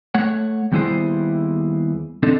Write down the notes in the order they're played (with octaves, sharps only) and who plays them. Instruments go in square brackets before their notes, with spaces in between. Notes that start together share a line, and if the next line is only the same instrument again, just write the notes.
[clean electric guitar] A3 C#5 F#5
D#2 G3 B3 E4 G#4 C5
C4 D4 D#4 A4